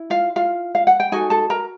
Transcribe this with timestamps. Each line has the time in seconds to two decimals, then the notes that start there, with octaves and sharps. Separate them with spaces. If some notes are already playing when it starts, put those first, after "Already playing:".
Already playing: E4
0.10 F4 F5
0.36 F4 F5
0.75 F5
0.87 F#5
1.00 G5
1.12 D#4 F#4 A4 G#5
1.30 A4 A5
1.50 A#4 A#5